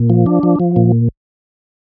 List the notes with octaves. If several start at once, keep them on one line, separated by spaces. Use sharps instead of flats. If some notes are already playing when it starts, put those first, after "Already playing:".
Already playing: A#2
F3
D4
F3
F3
A#2